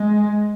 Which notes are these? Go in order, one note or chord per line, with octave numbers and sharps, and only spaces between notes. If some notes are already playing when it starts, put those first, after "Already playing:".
Already playing: G#3